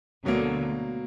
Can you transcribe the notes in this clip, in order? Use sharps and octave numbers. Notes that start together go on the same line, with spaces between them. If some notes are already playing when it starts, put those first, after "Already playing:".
D2 B2 D3 F#3 A#3